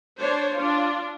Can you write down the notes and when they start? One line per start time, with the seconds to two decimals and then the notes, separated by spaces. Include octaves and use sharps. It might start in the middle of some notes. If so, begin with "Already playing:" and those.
0.19 D4 C5 C#5
0.55 D4 F4